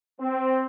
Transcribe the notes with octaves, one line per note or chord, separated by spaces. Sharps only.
C4